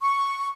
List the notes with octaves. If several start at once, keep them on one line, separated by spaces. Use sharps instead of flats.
C#6